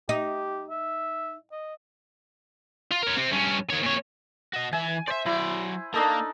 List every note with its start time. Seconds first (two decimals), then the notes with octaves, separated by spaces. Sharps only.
0.09 D#4 G4
0.70 E5
1.51 D#5
2.91 F4
3.03 A#4 C#5
3.17 C3 C4
3.32 G2 C#4
3.70 D#3 C#5
3.83 A#2 C#5
4.53 F#4 D#5
4.73 E3 E5 G#5
5.08 C5 D5 E5
5.26 F#3 E4 D5
5.94 A#3 D4 D#4 A4